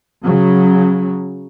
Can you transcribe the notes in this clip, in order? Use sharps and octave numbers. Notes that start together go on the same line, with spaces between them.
C#3 F#3